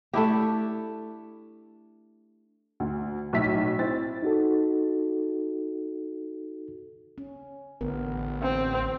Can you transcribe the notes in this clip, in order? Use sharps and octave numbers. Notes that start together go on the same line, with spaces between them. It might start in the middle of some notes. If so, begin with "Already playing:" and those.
A3 D4 E4 G4
D2
B1 A2 E5 B6
C4 E4 A6
D#4 F#4 A4
C#4
A1 D3 B3 A#4
C4